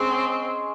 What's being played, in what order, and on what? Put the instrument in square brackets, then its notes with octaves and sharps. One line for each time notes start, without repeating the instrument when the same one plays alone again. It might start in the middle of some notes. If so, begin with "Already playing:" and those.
Already playing: [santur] G#3 C#4 G#4 [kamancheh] C4